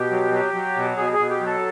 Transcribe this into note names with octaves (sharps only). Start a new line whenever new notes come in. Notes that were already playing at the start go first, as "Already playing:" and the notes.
Already playing: B2 G4
F#3
F#3
F#3
B2
B2 G#4
G#4
B2
G4
F#3
A4